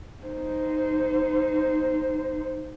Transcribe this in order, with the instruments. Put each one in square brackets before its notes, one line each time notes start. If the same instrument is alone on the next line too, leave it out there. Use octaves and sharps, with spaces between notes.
[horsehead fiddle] D#4 C5